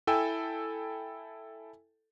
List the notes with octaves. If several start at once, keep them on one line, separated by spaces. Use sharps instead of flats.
E4 A4 G5 G#5 E6